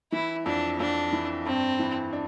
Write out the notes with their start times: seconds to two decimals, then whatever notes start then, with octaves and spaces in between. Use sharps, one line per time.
0.12 E3 E4
0.46 F2 D4
0.80 F2 D4
1.13 E3
1.46 G2 C4
1.79 E3
2.13 D4